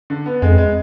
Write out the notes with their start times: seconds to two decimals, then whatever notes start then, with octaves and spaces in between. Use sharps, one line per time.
0.10 D3
0.26 B3
0.42 F2 G#3
0.58 G#3